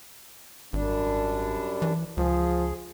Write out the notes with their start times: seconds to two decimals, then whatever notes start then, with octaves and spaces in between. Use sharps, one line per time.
0.73 G#1 F#2 G3 D4
1.82 E3
2.17 C#2 F3 G#4